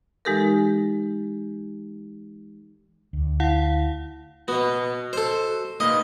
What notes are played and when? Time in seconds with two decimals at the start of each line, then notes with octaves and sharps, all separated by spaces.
0.25 E3 G#3 D#4 G4 A4 A#4
3.13 D2
3.40 E4 F5 F#5
4.48 B3 F#4 D#5
5.13 A4 C5
5.80 A#3 D#4 B4 D#5